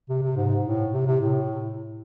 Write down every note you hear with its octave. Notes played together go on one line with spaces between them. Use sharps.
C3
C3
G#2
A2
C3
C3
A2